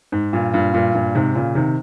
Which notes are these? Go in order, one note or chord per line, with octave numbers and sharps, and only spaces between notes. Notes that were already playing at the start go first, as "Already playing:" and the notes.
G#2
G2 A#2
G2 A#2
G2 A#2
G2 A#2
G#2 C3
A#2 C#3
C3 D#3